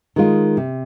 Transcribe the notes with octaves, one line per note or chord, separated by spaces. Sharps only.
D#3 G#3 F4
C3